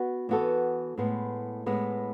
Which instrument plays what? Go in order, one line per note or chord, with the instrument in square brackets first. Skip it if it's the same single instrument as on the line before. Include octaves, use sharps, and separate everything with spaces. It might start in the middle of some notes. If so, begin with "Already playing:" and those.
Already playing: [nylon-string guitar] B3 F#4
E3 B3 F#4 A4
A2 G#3 B3
A2 G#3 B3